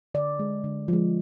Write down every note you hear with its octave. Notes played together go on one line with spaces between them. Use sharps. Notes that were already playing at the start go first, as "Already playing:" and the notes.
D3 D5
G#3
D3
F3 G#3